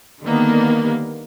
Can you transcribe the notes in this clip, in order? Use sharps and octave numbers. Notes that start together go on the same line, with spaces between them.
D3 D#3 G3 A#3 B3